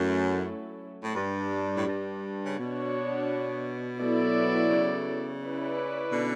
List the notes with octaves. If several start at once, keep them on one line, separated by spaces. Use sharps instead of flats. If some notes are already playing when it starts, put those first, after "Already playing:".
Already playing: F#2 F#3 A3 C#4 E4 A4
A2
G2 G3 D4 G4
A2
G2
C#3
B2 B3 D4 F#4 C#5
F#3 B3 E4 A4 D5
C#3
C#4 E4 B4 D5
B2 D3